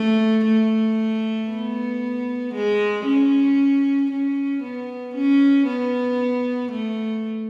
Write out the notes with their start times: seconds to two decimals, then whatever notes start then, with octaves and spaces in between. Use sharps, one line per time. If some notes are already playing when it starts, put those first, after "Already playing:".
Already playing: A3
0.45 A3
1.49 B3
2.54 G#3
3.06 C#4
4.11 C#4
4.63 B3
5.15 C#4
5.67 B3
6.72 A3